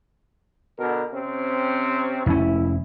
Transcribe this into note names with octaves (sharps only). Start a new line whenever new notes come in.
B2 D3 A#4
C3 C4 C#4
F1 C#4 E4